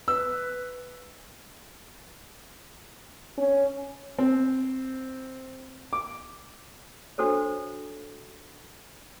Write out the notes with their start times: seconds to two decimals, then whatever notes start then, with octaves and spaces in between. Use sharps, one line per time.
0.08 B4 E6
3.38 C#4
4.18 C4
5.93 D6
7.18 D4 F#4 A4 C5 C#5